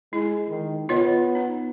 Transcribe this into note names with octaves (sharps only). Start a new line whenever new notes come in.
G#3 E4
D#3
B3 F4 C#5 D#5
D#4